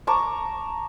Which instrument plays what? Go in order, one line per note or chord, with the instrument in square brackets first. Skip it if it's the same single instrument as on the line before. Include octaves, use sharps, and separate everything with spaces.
[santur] A5 A#5 C#6 D6